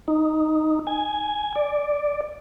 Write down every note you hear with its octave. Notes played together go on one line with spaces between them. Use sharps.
D#4
G#5
D5